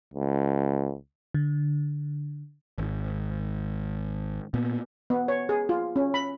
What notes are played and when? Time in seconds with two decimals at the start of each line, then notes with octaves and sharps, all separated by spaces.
0.14 C#2
1.34 D3
2.78 G#1
4.54 A#2 B3
5.10 B3
5.28 C#5
5.49 G#4
5.69 F4
5.96 C#4
6.14 B5